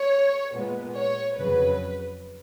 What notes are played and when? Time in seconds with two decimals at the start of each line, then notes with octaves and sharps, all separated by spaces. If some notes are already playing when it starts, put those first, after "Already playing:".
Already playing: C#5
0.55 A#2 G#3 B3
0.96 C#5
1.37 F2 C#3 F#3 B4